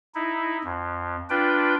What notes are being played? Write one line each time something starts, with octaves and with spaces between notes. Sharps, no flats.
D#4 E4
F2
D4 F4 B4 G5